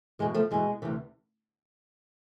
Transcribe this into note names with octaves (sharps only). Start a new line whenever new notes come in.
E2 B2 G#3
F3 A3
E2 B2 G#3
D2 C3 E3